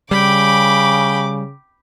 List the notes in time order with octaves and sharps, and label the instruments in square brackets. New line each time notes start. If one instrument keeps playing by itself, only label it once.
[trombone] C#3 [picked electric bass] G3 [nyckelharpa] G5 B5 [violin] D6